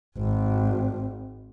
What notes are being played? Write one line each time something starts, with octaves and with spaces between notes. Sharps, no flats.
G#1